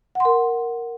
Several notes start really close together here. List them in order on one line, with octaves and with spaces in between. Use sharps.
F#5 C6 A#4